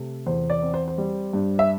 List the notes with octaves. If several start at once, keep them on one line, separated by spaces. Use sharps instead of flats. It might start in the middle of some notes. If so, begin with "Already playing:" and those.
Already playing: C3 A3
E2 C5
D5
C4
C5
C5
G3
G2
E5